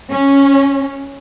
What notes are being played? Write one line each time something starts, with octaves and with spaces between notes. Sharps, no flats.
C#4